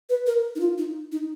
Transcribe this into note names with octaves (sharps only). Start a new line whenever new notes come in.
B4
A#4
D#4
F4
D#4
D#4